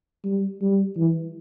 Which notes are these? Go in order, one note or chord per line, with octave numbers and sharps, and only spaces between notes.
G3
G3
E3